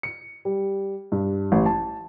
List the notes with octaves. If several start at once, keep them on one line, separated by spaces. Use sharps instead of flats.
C#7
G3
G2
A1
A5